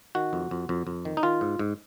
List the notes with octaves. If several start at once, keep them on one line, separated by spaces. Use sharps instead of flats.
D#3 F#4
F2
F2
F2
F2
D#3
D#4
D#3 F4
G#2
G#2